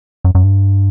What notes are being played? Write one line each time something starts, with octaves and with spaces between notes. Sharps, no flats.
F#2
F#2
G2